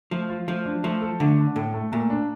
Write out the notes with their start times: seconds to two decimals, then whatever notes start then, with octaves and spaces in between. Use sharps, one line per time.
0.11 F3 A3
0.30 F4
0.48 F3 A3
0.66 D4
0.84 F3 A3
1.02 A4
1.20 D3 A3
1.38 D4
1.56 A2 A4
1.74 A3
1.92 A#2 A3
2.10 D4